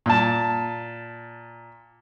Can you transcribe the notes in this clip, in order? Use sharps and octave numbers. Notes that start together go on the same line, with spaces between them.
A#2 A5